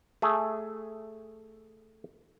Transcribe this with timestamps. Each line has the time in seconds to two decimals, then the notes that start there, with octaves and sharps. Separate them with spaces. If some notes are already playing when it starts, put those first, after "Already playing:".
0.22 A3 G#4